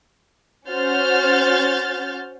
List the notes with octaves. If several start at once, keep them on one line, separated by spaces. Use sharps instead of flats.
C#4 F#4 C5 F6 G6 A6